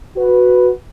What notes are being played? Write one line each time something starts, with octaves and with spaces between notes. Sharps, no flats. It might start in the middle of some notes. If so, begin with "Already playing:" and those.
F#4 B4